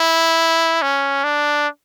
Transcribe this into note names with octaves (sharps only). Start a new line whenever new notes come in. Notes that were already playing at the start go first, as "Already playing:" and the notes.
Already playing: E4
C#4
D4